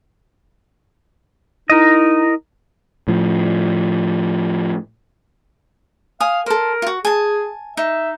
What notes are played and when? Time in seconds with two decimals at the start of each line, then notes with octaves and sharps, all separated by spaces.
1.70 D#4 E4 A#4 D#5
3.08 A2 F3
6.20 F5 G#5 D#6
6.46 A4 A#4 C5
6.82 F4 F#4
7.05 G#4 G#5 A5
7.77 D#4 E5